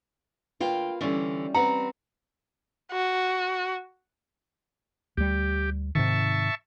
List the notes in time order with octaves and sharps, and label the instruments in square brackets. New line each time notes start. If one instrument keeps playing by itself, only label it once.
[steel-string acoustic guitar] D2 G5 [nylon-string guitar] A#3 F4 B4
[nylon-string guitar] D3 E3 [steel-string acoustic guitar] G3 C#4 F4
[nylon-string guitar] C4 B4 F#5 [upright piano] A#5
[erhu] F#4
[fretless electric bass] D2 G3 [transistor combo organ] G4
[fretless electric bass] G#2 C3 D#3 [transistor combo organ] E5 A5 C#6